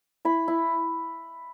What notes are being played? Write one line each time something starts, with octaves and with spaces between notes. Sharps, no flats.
E4 B5
E4